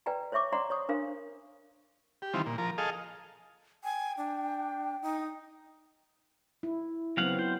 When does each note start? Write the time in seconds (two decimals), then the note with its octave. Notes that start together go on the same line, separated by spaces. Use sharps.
0.06 B4 D5 G5 G#5 A#5
0.32 C5 C#5 E5 C#6 D6
0.53 C5 D5 F#5 A#5 C6
0.70 C#5 C#6 D#6
0.89 D4 A#4 C5 F5
2.22 G4
2.34 D#3 E3 G3 C4 F4
2.46 A#2
2.58 F3 A#4
2.78 G#4 A4 D#5 F5
3.84 G5 G#5
4.17 D4
5.02 D#4
6.63 E4
7.17 C#3 F#3 B3 C4 F5 F#5
7.39 E4 C5